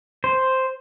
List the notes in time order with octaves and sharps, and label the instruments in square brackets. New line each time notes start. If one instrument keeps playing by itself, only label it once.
[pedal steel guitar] C5